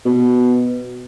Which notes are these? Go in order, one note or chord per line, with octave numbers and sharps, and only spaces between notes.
B2